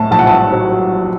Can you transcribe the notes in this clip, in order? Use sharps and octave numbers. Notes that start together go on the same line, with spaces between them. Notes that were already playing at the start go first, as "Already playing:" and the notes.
Already playing: A2 A5
A#1 A5
F#5
A5
F#3